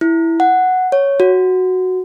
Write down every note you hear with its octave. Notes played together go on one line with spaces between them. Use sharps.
E4
F#5
C#5
F#4